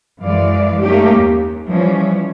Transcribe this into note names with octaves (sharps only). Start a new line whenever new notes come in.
F#2 E3 G#3 D5 F5
A3 A#3 C#4 D#4 G4
D#2
E3 F3 G3 C#4